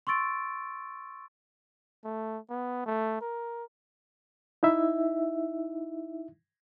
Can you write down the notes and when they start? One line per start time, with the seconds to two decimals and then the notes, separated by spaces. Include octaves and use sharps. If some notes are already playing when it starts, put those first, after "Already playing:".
0.07 C6 C#6 E6 A6 D7
2.04 A3
2.50 B3
2.86 A3
3.21 A#4
4.63 D#4 E4 E5